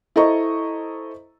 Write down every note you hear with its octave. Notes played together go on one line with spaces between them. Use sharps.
E4 A4 C5 D#5 A#5 C#6